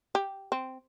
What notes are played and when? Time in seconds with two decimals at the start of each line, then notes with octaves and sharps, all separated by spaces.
0.15 G4
0.52 C4